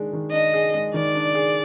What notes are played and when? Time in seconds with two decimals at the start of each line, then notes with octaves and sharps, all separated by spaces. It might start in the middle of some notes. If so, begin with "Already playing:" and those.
Already playing: D#3 G#3 D4 G#4
0.13 D#3
0.32 D4 D#5
0.53 G#4
0.75 G#3
0.94 D#3 D5
1.14 D4
1.35 G#4